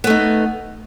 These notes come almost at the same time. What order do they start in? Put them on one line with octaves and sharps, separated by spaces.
B3 A3 D#4